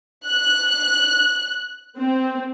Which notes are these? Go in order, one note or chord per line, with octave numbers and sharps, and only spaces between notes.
F#6
C4